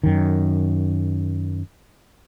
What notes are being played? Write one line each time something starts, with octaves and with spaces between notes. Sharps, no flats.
F#2 D#3